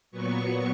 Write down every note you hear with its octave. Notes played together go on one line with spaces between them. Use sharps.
A#2 F#3 B3 C#6